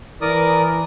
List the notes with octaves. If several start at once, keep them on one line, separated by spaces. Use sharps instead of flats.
E3 A#4 D5 D#6